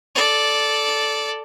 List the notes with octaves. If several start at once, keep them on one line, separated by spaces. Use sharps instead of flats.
A4 D5